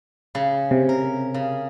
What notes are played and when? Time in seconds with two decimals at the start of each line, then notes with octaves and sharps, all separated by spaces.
0.35 C#3
0.71 C3
0.89 A#4
1.34 C#3